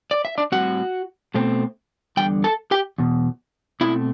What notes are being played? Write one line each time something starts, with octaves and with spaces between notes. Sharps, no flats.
D5
E5
D4 D5
A2 G3 C4 F#4 F#5
B2 A3 C4
E2 D3 G3 G5
A4 A5
G4 G5
E2 B2
B2 A3 C4 E4 E5